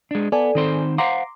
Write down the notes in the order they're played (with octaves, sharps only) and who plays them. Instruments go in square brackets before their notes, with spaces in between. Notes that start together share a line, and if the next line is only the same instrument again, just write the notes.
[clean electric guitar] G#3 D4
[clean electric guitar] B3 [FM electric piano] A4 D5 G#5
[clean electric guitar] D#3 C4 C5
[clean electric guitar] C5 F5 F#5 [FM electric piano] A#5 C6 D6